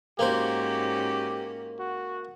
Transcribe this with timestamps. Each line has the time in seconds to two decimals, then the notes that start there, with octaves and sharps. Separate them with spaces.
0.19 G#2 A#3 C#4 F#4 G4 C5
1.79 F#4